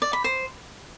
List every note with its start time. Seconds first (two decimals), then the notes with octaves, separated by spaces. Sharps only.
0.02 D5
0.13 B5
0.24 C5